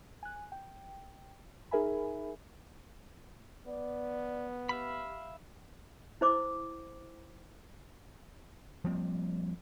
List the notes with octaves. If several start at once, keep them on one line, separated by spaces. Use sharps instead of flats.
G#5 F#6
G5
D#4 G#4 A#4 E5 G#5 B5
B3 D5
G4 E5 F5 B5
E4 C5 D6
F3 G3 A#3 C4